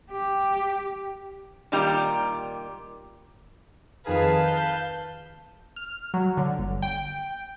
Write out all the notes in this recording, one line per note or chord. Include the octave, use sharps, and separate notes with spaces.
G4
A#2 D#3 G3 G4 A#5
F2 D#3 G#4 B4 F5 A5
G6
F6
F#3
D3
G1
G5